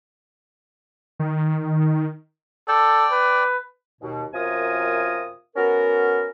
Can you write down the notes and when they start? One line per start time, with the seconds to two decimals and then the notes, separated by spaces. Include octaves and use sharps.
1.20 D#3
2.68 A4 D5 G5
3.12 B4
4.01 D#2 B2
4.34 F#2 C3 F4 A#4 G#5 D#6
5.56 B3 C#4 F#4 A#4